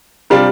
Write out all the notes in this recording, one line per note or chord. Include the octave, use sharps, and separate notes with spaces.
C3 G3 D4 F4